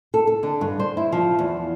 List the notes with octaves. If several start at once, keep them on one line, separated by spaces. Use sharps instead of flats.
A4
A4
D3
G2
C5
E4
F3
E2